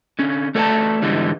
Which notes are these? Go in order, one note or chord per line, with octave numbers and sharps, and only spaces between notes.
D3 C#4
A3 A4 B4 D5 G5 A5
G#2 D3 E3 G3